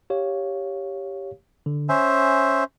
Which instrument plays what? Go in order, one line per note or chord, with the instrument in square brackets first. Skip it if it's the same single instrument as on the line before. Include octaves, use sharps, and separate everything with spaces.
[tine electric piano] G4 C#5 F5
D3
[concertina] C#4 C5 E5 [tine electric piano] G#5